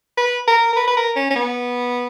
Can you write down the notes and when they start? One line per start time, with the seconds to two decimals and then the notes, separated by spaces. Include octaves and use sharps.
0.17 B4
0.47 A#4
0.73 A#4
0.76 B4
0.88 B4
0.97 A#4
1.16 C#4
1.31 C#4
1.36 B3